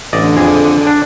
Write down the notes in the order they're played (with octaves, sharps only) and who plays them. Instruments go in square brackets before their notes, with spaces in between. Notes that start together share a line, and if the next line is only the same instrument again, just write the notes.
[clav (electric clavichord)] A1 D5 D#5 [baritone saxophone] D3
[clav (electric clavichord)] F2 G#4
D4